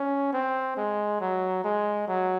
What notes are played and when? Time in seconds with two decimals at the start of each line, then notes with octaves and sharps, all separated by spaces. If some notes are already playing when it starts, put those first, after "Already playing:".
Already playing: C#4
0.33 C4
0.77 G#3
1.21 F#3
1.65 G#3
2.08 F#3